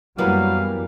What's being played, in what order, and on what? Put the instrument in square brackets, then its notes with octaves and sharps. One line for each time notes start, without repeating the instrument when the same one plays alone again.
[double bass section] F#2 G3 [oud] E3 A#3 B3 [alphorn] F#3 [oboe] F5